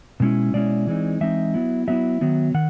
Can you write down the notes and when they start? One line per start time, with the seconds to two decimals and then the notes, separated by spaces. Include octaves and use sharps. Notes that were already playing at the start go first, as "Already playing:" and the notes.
0.20 B2 G#3 C#4 E4
0.53 B2 G#3 C#4 E4 D5
0.87 E3 G#3 C4 D#4
1.21 E3 G#3 C4 D#4 E5
1.54 F#3 B3 E4
1.88 F#3 B3 E4 E5
2.21 D#3 F#3 B3
2.54 D#3 F#5